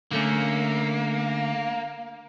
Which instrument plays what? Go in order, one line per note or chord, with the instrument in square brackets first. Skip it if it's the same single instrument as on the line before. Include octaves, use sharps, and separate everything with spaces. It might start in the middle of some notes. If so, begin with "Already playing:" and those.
[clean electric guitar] D3 A3 C#4 [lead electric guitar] A#3